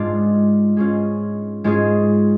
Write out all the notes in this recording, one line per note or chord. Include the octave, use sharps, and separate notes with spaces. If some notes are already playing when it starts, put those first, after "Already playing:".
Already playing: G#2 G#3 D4 F4
G#2 G#3 C#4 F4 G#4
G#2 G#3 C#4 F4 G#4